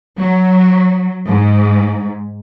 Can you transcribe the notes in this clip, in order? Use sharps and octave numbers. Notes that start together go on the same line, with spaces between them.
F#3
G#2